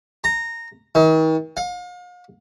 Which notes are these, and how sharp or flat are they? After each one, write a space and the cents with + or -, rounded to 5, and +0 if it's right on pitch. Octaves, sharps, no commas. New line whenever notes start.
A#5 -15
D#3 +40
F5 +40